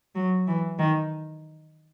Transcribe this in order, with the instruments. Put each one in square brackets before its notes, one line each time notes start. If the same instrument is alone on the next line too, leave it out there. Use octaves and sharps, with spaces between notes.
[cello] F#3
E3
D#3